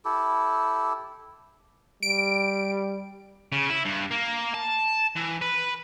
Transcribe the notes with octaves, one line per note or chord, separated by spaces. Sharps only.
E4 G4 A4
G3 D7
C#3
E4
G2
A#3
A5
E3
B4